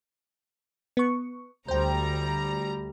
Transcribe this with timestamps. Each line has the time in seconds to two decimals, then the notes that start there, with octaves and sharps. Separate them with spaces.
0.97 B3 C#6
1.68 D2 G3 C5 G5 A#5